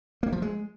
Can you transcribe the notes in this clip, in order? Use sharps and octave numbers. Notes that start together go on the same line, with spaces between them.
A#3
F3
G#3